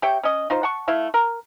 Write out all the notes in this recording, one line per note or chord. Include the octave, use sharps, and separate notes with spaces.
G4 C#5 E5 G5
C#4 D#5
D#4 F4 C5
F#5 A5 C#6
A3 E4 F5
A#4